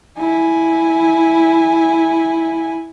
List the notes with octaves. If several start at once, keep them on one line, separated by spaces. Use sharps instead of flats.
E4 G#5